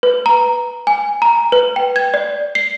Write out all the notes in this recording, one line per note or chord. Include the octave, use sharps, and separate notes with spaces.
B4
A#5
G#5
A#5
B4
G5
G#6
D5
C7